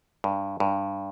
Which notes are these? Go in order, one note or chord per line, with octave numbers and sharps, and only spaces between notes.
G2
G2